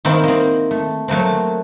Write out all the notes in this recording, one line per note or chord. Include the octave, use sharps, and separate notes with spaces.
D#3 A#3 C4 E4
A#3 C4
A3
F#3 A3 A#3 C4